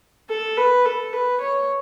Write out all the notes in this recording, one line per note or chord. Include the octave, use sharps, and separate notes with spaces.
A4
B4
A4
B4
C#5